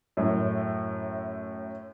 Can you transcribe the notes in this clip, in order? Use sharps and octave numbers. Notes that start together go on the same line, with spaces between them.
F#2 A2